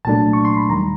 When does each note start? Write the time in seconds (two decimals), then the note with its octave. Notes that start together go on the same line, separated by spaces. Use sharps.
0.05 C2 A#2 F#3 A3 D4 A5
0.33 C#6
0.45 C6
0.57 B5
0.69 D#2 D#3 G3 A#5